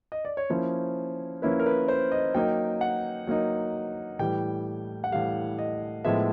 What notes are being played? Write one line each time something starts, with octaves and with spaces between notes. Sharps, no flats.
D#5
D5
C#5
F3 A#3 C#4 E4 C5
F3 A#3 C#4 E4 B4
A#4
B4
C5
D#5
F#3 A#3 D#4 G5
F#5
F#3 A#3 D#4
A2 E3 G3 G5
F#5
A2 E3 G3 F5
D#5
A2 F3 G#3 B3 E5